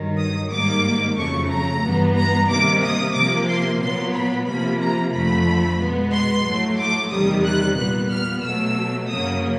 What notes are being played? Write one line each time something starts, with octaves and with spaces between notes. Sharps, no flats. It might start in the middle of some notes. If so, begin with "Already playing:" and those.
Already playing: G2 D#3 F#3
D#6
G#2 D#3 G3 A#3 D6
F2 C#3 F#3 A3 C#6
A#5
G2 E3 G3 B3
A#5
C3 D#3 G3 A#3 D6
D#6
C3 F3 A#3 D6
C6
A#2 F#3 B3 C6
B5
C3 F3 A#3 B5
A#5
F2 D3 F3 A3 B5
B2 G#3 B3
C6
A2 F#3 A3
D6
E2 C3 D#3 G3 D#6
F#6
A#2 G3 B3 F#6
F6
B2 F#3 A3 E6
F#2 C#3 F#3 A#3 D#6